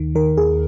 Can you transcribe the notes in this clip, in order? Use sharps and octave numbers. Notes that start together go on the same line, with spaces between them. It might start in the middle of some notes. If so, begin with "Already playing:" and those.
Already playing: D#2 D#3
D#3 A#4
D#2 G#4